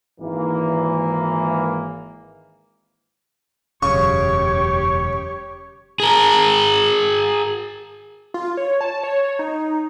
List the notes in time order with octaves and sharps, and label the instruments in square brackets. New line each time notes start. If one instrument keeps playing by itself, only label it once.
[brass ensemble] G#1 E3 A#3
[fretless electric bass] E1 F#2 [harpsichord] C#3 [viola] G4 C#5 [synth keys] C#6
[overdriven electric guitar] G#4 A#4
[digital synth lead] F4
C#5
A5
C#5
D#4